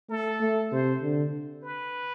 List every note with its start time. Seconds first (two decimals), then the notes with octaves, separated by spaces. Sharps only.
0.10 A3 A4
0.40 A3
0.72 C3 C5
1.03 D3
1.63 B4